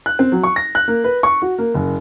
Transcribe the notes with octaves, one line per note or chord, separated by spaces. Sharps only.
F#6
C4
F#3
C#6
A#6
F#6
A#3
B4
C#6
F#4
A#3
F#1